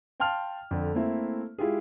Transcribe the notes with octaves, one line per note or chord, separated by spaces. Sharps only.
F5 G5 A5 C6 F6 F7
F2 D3
A3 A#3 C4 E4 E5
G#3 E4 F4 G4 G#4